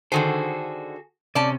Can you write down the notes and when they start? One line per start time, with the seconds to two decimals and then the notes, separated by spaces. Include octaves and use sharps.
0.12 D3 D#3 F#4 G#4 A4 C5
1.35 C3 C#4 D5 A5